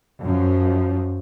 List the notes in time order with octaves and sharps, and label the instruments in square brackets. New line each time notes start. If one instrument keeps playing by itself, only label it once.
[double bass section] F#2 F3